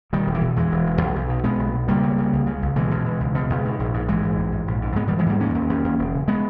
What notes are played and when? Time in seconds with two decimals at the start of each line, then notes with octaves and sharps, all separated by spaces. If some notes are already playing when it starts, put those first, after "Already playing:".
0.13 B2 D#3 G3
0.27 E1
0.35 E3
0.41 B2
0.56 E2 E3 G#3
0.71 E1
0.86 E1
1.01 B1
1.16 B1
1.29 B2
1.44 B2 G#3 B3
1.59 B1
1.74 B2
1.88 C#2 G3 A#3
2.03 C#3
2.18 C#3
2.33 C#2
2.47 C#3
2.62 C#2
2.76 B2 E3 G#3
2.91 B2
3.06 B2
3.20 C#2
3.35 B2
3.50 C#2
3.65 G#2
3.80 A#1
3.94 G#2
4.08 G#2 E3 G#3
4.22 A#1
4.38 G#2
4.52 G#2
4.68 A#1
4.81 G#2
4.96 G#2 G#3 B3
5.07 D#3 G3
5.12 G#2
5.18 E3 G#3
5.26 G#2 G3 A#3
5.40 D#2 A#3 C#4
5.54 D#2
5.69 D#2
5.84 D#2
5.99 E1
6.13 C#3
6.28 G#3 B3